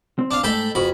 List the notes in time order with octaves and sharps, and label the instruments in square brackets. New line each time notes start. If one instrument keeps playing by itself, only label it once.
[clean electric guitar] C4
[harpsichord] D4 F5
[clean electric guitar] G#2 A3 D#5 [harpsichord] A4 G5 B5
[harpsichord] F2 B5 [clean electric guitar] F#4 G#4 B4